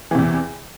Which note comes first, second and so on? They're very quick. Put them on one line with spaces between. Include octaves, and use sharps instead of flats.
E3 C3 E2